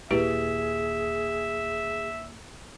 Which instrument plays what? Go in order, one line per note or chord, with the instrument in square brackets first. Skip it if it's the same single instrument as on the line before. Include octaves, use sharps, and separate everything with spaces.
[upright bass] D#2 A#2 [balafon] E4 G4 B4 [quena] G#4 [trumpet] E5